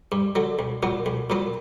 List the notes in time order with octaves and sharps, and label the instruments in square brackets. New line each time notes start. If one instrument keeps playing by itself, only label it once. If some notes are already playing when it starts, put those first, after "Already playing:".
[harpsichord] G2
D3 F#3
B1
A#2 F#3 B3
B1
A#2 F#3 B3